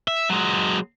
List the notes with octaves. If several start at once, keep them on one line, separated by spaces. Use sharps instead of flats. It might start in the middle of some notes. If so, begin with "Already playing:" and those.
E5
F#3 G#3